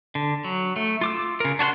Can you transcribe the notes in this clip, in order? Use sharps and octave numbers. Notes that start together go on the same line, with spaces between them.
D3
F#3
A3
F4 D6 E6
C#3 A#4
D4 F#4 C#5 F#5 C6